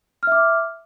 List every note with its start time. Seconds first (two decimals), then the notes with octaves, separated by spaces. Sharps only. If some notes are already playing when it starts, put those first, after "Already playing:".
0.23 F6
0.27 E5
0.32 D6